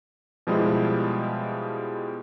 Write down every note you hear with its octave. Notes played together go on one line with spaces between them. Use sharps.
B2 F3 G3 G#3 E4